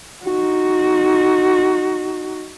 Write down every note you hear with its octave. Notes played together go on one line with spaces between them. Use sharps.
D#4 F#4